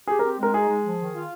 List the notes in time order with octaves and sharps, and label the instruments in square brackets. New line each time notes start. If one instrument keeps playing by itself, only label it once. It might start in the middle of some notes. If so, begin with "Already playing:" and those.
[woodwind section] G4 [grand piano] G#4
[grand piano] A#4
[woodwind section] C4
[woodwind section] G#3 [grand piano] A#4
[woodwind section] D#4 [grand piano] G#4
[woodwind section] G#3
F3
D#3
F4